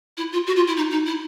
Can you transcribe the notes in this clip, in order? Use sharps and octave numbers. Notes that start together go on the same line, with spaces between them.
E4
F4
F#4
F4
E4
D#4
D#4
E4